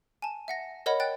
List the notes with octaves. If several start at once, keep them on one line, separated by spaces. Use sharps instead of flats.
G#5 A5
E5 F#5 A#6
A#4 C#5 D#5 F#5 B5
G5 F#6 A6